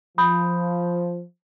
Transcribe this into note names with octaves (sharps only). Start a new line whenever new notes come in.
F3 B5 D#6 G6